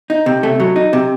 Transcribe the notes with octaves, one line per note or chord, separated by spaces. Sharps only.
D#4
C3
A3
F#3
D#4
C3